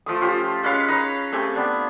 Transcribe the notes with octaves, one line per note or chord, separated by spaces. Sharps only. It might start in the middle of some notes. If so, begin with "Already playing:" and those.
F3 A3 D#6
C#4 F4 G4 C5
G#3 C#4 B4 F5
D#4 B4 C#5
A3 C4 G4 G#5
B3 D4